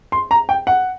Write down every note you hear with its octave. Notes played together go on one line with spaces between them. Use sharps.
C6
A#5
G5
F#5